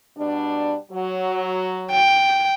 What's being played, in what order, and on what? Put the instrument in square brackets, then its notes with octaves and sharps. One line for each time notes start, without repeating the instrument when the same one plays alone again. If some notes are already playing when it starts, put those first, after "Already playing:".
[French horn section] B2 G3 D4
F#3
[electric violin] G5